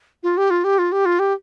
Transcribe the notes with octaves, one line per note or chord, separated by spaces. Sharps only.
F4
G4
F4
G4
F4
G4
F4
G4